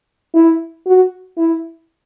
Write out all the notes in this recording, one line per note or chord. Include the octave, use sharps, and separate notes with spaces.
E4
F#4
E4